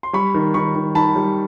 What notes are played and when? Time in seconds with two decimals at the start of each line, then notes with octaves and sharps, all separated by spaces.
0.03 C6
0.13 G3 B5 C#6
0.34 D#3
0.54 D#3 B5 C#6
0.75 D#3
0.95 D#3 A5 B5
1.16 G3